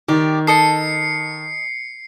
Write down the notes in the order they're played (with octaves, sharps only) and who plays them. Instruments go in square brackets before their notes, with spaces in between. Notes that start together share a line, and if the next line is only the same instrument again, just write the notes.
[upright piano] D#3 [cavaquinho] G4 D5
[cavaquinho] A4 D#5 A5 [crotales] C7 C#7